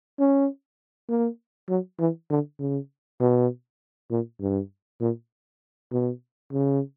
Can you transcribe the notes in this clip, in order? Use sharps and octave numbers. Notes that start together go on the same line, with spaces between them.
C#4
A#3
F#3
E3
D3
C#3
B2
A#2
G2
A#2
B2
C#3